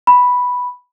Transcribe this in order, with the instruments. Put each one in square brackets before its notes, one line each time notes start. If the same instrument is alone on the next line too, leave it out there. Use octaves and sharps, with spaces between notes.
[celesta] B5